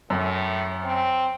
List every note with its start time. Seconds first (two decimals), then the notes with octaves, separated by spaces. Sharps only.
0.10 F#2 A2
0.83 C4